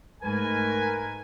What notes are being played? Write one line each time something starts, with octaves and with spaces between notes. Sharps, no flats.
G#2 A3 A#4 B4 G#5